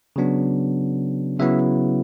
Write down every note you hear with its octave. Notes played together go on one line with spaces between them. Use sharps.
C#3 F#3 B3 D4
C#3 F#3 B3 E4 E5